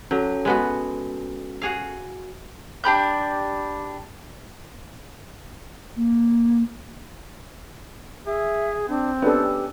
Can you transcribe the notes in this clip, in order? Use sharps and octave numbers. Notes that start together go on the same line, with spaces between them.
F#3 C#4 A4
G#3 B3 F#4
F#4 G#4 F5
D4 G4 B5 G6
A#3
G#4 E5
C4 D4
B3 C#4 D4 G4 A4